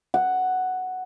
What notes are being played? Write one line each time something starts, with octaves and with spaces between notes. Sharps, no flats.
F#5